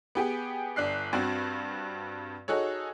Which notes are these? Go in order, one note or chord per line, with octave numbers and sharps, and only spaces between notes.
B3 G4 G#4
G1 D4 F#6 C7
G2 C4 F#4
D#4 F#4 G#4 A4 C#5